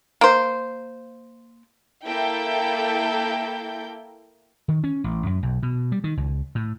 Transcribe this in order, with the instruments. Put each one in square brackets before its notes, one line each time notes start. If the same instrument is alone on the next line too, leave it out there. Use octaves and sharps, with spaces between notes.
[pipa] A#3 C5
[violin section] A#3 E4 A4 G5 G6
[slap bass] D#3
C#4
A1
F#2
B1
B2
G3
D#3
C#2
A2